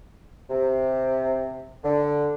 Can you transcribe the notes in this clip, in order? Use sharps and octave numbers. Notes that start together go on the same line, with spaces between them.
C3
D3